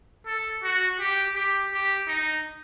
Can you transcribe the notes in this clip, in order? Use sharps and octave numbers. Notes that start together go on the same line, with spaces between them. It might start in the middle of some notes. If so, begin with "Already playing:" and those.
A4
F#4
G4
G4
G4
D#4